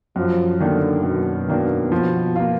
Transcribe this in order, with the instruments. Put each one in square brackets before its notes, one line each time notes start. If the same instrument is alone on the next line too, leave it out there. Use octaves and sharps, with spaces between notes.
[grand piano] F#2 [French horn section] F3
[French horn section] D3 [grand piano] D#3 A#3 D4
[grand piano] F#2 [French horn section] B2
[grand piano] D#3 A#3 D4
F3
A#3 F4